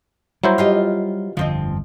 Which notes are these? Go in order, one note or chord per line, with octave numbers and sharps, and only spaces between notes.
F#3 G3 A#3 E4 C5
F4 G4 D#5
G1 F2 D3 F3 C4 D#5